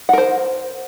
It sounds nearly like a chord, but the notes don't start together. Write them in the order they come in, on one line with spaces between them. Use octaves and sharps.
F#5 A#4 C5